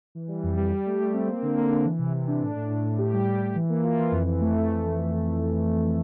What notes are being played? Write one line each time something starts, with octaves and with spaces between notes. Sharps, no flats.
E3
G3
F2
G3
G4
A3
A3
C4
A#3
D3
A#3
D4
E3
C3
E3
D4
A2
A2
A2
A2
G4
G3
G4
G3
E3
A#3
F4
E3
F2
E3
A3